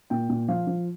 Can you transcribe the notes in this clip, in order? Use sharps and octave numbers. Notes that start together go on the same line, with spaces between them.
A#2 G5
A#2
F3 F5
F3